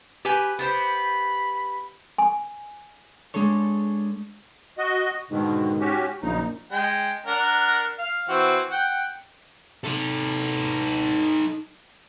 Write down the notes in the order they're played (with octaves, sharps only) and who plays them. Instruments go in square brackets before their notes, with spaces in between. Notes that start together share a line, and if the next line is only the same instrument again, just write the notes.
[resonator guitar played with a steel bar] G4 B4 G#5
[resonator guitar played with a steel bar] B3 G4 C5 [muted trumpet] B5
[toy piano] G#5
[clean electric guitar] G#3 D4 G#4 A4 C#5
[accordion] F#4 D#5
[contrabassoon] G#2 [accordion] B2 D3 D#3
[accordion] C#4 F#4 G4
[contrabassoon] A#1 [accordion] F#2 C#3 D#4
[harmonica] G#3 G5
D4 A#4 F#5
F5
E3 C4 F#4
F#5 G5
[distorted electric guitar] D#4 A4